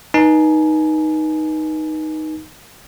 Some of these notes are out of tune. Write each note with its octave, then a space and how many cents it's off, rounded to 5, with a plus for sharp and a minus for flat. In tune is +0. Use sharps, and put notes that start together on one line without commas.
D#4 +0 B4 -30 G#5 +30